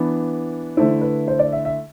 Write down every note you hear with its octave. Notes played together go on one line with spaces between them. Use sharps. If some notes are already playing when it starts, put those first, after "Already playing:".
Already playing: E3 B3 D4
D3 A3 E4 C5
B4
C5
D5
E5
E5